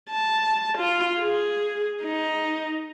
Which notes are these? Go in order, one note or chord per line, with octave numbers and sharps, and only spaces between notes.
A5
F4
G#4
D#4